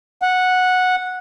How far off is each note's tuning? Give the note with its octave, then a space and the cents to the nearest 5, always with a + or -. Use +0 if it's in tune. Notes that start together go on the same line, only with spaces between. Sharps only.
F#5 -10